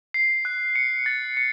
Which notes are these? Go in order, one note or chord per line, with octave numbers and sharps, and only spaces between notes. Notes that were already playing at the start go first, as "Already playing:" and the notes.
C7
F#6
C#7
A6
C#7